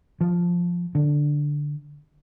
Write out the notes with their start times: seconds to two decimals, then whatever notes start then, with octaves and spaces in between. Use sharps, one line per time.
0.21 F3
0.95 D3